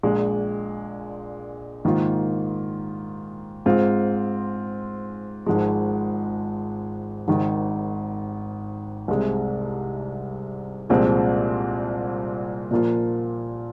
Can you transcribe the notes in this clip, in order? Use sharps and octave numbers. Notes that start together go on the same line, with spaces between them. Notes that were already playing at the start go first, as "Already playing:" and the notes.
A#1 A#2 G#3
G#2 D#3 A#3 F4
G#2 G#3 C4 F4
G#1 G#2 F3 G#3
G#1 G#2 D#3
C2 C3 G#3
C2 A#2 F3 G#3 C4
A#2 F3 A#3 F4